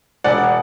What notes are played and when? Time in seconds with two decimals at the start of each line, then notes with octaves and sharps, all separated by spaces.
0.24 E1 D5 F#5